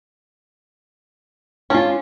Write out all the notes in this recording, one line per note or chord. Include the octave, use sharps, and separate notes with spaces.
C#4 D4 F4